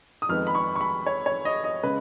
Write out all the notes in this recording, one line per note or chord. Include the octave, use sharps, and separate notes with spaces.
D#6
F2 D#3 G#3 B3 F6
B5
C#6
C#6
B5
C#5
C#5
D#5
D#5
C#3 G#3 B4